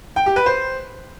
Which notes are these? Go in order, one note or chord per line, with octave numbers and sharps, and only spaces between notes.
G5
G4
B4
C5